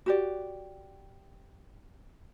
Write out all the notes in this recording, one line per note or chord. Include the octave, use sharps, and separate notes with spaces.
F#4 G4 D5